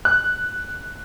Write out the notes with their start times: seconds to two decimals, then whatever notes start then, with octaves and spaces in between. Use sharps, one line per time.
0.05 F#6